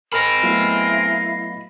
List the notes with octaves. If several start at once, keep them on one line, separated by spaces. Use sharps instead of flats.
C4 G#4 A#4 D#5 B5
F#3 A3 B3 E4 F5